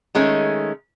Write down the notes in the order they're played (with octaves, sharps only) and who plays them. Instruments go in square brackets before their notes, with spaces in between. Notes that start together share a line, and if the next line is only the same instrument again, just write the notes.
[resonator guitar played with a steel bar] D#3 G#3 A3 C#4